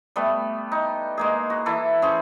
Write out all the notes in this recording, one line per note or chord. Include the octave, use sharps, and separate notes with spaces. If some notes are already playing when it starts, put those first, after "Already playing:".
G3 A3 B3
D#4
G#3 A#3 G#4
F#4
E3 E4 A4
C#4 G#4 C5